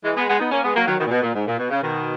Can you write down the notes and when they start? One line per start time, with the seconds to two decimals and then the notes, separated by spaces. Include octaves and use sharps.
0.04 E3 G#3
0.16 G#3 B3
0.28 G#3 B3
0.39 B3 D#4
0.51 A#3 C#4
0.63 G#3 B3
0.75 F#3 A#3
0.87 D#3 F#3
0.99 B2 D#3
1.06 A#2
1.11 B2
1.22 A#2
1.34 G#2
1.46 A#2
1.58 B2
1.70 C#3
1.82 B2 D#3